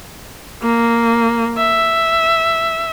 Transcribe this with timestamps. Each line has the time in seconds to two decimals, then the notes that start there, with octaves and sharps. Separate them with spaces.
0.62 A#3
1.58 E5